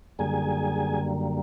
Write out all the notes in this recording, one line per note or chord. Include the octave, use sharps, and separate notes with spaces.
F#2 D3 G3 A#3 G#4 G#5